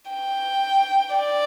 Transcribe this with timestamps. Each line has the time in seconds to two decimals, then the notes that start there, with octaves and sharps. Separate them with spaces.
0.11 G5
1.16 D5